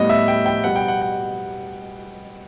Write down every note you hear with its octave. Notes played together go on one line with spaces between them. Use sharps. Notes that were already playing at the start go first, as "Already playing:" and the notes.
Already playing: A2 G3 B3 D#5
E5
G5
G5
B2 G3 B3 F#5
G5
F#5
F#5